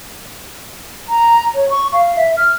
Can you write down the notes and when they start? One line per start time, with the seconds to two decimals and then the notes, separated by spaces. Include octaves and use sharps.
1.09 A#5
1.55 C#5
1.70 C#6
1.93 F5
2.17 E5
2.37 F6